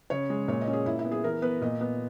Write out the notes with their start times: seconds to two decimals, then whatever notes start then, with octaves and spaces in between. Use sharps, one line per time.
0.10 C#3 C#5
0.30 G#3
0.48 A#2 C#5
0.61 D#5
0.67 C#4
0.73 G#4
0.86 A#2 E4
0.99 E4
1.05 B3
1.12 G#4
1.24 E3 A#4
1.42 B3 B4
1.61 A#2 D#5
1.81 B3